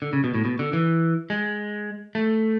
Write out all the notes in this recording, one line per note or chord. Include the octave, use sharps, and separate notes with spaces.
D3
C#3
B2
A2
B2
D3
E3
G#3
A3